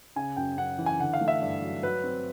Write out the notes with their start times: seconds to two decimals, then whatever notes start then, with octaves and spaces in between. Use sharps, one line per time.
0.16 C#3 G#5
0.37 F#2 G5
0.57 F#2 F#5
0.78 E3
0.86 G#5
1.00 D3 F#5
1.14 F5
1.21 A3
1.28 E5
1.41 G2
1.62 F#3
1.83 F#3 B4
2.03 C4